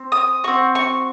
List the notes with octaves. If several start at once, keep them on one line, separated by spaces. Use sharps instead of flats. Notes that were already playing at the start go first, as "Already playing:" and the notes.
Already playing: C4
D#6
C4 F#4 C#6
C#6